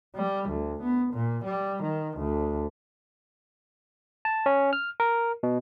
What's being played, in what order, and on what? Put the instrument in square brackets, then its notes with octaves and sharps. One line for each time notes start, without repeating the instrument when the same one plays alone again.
[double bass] G3
D2
B3
A#2
G3
D#3
D2
[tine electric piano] A5
C#4
F6
A#4
B2